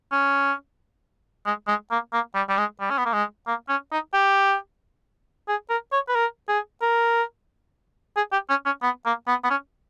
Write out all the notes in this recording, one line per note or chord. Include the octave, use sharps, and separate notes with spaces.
C#4
G#3
G#3
A#3
A#3
G3
G3
G#3
G3
C#4
B3
A#3
G#3
A#3
C#4
D#4
G4
G#4
A#4
C#5
B4
A#4
G#4
A#4
G#4
G4
C#4
C#4
B3
A#3
B3
B3
C#4